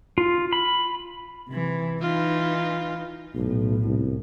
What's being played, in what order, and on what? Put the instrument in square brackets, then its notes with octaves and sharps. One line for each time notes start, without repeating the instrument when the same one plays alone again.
[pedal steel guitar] F4
B5
[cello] C3 E3
[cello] E3 D#4 [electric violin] F4
[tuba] B1 [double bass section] A2
[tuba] C2